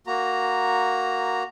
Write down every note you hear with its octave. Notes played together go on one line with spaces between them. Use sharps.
A#3 F#4 A#5